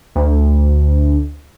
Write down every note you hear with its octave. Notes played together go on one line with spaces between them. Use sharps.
D2